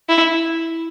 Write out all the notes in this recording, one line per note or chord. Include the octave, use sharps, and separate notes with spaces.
E4